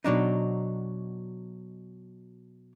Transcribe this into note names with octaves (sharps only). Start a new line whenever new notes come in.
B2 F#3 D4 D#4